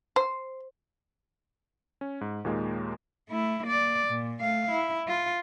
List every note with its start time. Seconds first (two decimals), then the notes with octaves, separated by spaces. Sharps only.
0.16 C5
2.01 C#4
2.21 G#2
2.45 D#2 A#2 G#3 A#3 D#4
3.29 A3 E4
3.63 A#3 D5
4.07 A#2
4.41 A3 F5
4.71 E4
5.08 F4